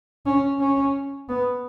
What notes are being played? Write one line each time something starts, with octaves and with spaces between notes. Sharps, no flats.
C#4
C#4
B3